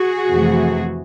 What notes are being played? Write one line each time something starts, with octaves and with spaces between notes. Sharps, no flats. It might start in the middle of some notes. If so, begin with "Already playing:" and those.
Already playing: F#4 G#4
F2 C3 E3 A3